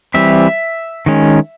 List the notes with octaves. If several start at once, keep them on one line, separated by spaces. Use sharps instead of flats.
E3 G3 C4 E5
D#3 G#3 C#4